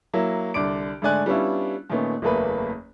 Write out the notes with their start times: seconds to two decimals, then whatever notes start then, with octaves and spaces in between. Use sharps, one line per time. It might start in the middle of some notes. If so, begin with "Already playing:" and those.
0.13 F#3 A#3 E4
0.54 C2 D3 D5 D6 D7
1.02 G#2 D3 A3 D5 G#5 F#6
1.26 G3 B3 C#4 D4 E4 F4
1.90 A#2 D#3 A3 B3 C#4
2.22 F#1 E2 A3 A#3 B4 B5